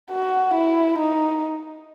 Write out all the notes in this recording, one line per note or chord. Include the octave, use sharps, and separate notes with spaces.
F#4
E4
D#4